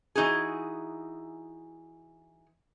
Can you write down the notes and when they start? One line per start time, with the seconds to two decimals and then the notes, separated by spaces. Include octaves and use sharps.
0.15 E3 D#4 F#4 G#4